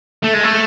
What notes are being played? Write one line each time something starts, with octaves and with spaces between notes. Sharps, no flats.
A3
G#3
A3